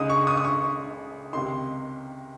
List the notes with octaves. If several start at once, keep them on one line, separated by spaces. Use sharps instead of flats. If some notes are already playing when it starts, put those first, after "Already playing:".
Already playing: C#2 C#3 G#3 D#4 D#6
C#6
D#6
D#6
C#6
C#2 C3 D#3 C6